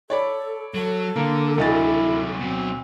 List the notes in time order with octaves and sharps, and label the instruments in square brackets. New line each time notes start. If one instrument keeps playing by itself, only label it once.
[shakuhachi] A4 [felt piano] C#5 D5 B5
[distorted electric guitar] F#3 [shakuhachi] A4
[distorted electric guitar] D3 [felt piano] A#3
[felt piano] D2 D#5 A6 [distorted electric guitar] C3 F#3 [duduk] E4
[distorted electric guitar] B2 F#3 [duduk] C4